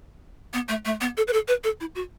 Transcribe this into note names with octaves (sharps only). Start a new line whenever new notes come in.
B3
A3
A3
B3
A4
B4
A4
B4
A4
E4
F#4